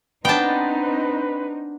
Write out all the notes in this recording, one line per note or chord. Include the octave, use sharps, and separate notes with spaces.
B3 C4 D4 D#4 B4 G5 A5